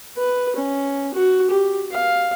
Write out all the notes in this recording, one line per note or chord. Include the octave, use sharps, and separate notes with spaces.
B4
C#4
F#4
G4
F5